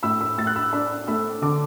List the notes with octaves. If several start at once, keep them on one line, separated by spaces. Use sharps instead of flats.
A2 B5 E6
B5 E6
A2 E6 A6
F#6
B5 E6
D4 B5 E6
A3 B5 E6
D3 A5 D6